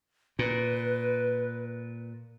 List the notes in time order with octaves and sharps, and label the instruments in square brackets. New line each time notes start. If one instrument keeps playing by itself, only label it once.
[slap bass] A#2 [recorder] B4